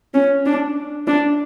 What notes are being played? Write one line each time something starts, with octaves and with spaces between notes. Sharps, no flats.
C#4
D4
D4